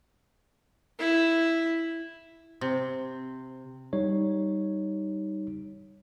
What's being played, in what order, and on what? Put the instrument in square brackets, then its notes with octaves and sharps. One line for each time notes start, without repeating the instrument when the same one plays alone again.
[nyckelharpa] E4
[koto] C3
[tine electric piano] G3 D#4 C#5